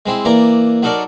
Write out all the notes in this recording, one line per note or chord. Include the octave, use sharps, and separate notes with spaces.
G#3 C4 E4
E3 A#3 D5 A#5
F#3 D#4 A4 A#4 D5